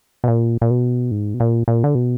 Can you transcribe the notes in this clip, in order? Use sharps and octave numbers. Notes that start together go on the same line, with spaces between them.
B2
A#2
A#2
B2
G#2
B2
A#2
A#2
D3
B2